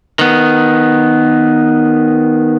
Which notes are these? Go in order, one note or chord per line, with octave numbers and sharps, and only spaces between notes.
D#3 B3